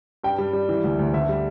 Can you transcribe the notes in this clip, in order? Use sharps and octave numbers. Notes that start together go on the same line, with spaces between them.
G2 G5
G3
G3
E3
D2
D2
D3 E5
G3